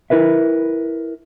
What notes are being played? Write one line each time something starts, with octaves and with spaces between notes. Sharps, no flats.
E4 A#4 B4 E5